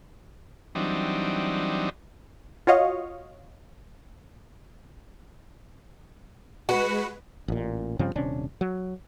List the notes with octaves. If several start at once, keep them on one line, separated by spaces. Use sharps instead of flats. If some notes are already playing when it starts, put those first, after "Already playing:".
E3 F#3 G3 C4 D4 D#4
F4 F#4 C#5 D#5 F5
G#3 F#4 B4
A1 A#2
G2 C#3 F3 C4
D#1 C3 C#4 D4
F#3